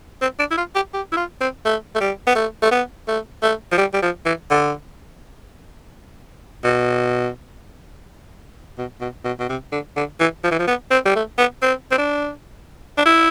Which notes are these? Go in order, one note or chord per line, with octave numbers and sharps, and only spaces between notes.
C4
D4
E4
F4
G4
G4
E4
F4
C4
A3
A3
G3
B3
A3
A3
B3
A3
A3
F3
G3
G3
F3
E3
D3
B2
B2
B2
B2
B2
C3
D3
D3
E3
F3
E3
F3
B3
C4
G3
A3
B3
C4
C4
D4
D4
E4